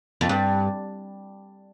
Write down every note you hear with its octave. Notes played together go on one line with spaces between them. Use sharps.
F2
G2